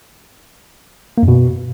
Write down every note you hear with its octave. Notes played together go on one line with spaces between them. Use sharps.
A#3
F#2
B2